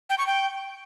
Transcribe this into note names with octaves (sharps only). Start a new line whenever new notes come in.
G5
C#6
G5